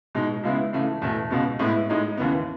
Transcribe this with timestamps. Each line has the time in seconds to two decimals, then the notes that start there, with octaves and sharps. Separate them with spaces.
0.15 B2 G#3 D#4
0.43 C#2 C#3 G#3 B3 E4
0.73 C#2 C#3 E3 A3
1.02 E2 B2 A3
1.30 C#2 B2 G#3 B3
1.59 A2 G#3 B3 E4
1.90 A2 G#3 D#4
2.17 D#2 C#3 E3 B3